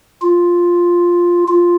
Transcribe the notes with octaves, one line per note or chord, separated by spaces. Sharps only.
F4
F4